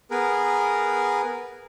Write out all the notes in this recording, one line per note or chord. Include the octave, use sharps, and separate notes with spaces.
B3 G#4 A#4 B4